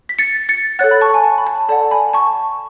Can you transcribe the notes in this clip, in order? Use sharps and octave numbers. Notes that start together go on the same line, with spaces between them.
B6
A6 C#7
A6 C#7
A4 C#5 F#5 F#6 A6
B5
A5 C#6
G#5
A5
B5
A5
A4 D5 F#5 A5
G#5 B5
A5 C#6